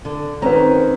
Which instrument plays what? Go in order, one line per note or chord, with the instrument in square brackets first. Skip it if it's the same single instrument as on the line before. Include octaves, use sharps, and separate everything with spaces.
[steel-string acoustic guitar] D3
[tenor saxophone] D#3 [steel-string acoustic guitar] C4 C#4 [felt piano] B4 C5 A#5